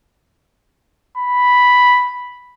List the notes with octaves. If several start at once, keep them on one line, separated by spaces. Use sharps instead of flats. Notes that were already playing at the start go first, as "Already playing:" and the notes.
B5